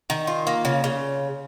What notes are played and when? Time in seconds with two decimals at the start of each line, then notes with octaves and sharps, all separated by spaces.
0.10 D#3
0.27 F4
0.47 A#3
0.65 C#3
0.84 C#3